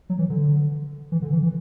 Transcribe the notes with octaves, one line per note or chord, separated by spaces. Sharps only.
F#3
E3
D3
E3
D3
E3
E3